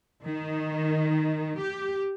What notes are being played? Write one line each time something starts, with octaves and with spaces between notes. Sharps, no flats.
D#3
G4